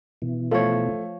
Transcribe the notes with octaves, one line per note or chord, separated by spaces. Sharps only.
B2 E3
F3 A3 C#5